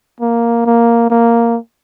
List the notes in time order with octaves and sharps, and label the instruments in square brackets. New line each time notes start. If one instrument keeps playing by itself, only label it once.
[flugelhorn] A#3
A#3
A#3